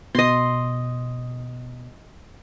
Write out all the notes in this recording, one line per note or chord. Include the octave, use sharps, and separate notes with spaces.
B2 D#5 C6